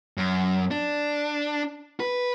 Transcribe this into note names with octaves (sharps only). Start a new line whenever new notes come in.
F#2
D4
B4